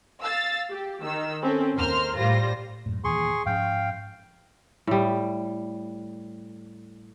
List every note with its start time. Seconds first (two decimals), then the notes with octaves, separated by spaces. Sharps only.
0.20 F5 E6 A6
0.70 G4
1.03 D#3 E6
1.42 C4 C#4 A4
1.77 D#2 A#4 C5 C6 F6
2.17 A2 G3 F4 C5 A#6
2.86 F#2 A2
3.04 D#2 A#2 E3 G#4 C6 C#6
3.46 G#2 F3 C#4 F5 G5
4.87 A2 G3